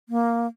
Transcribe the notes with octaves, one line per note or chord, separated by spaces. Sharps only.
A#3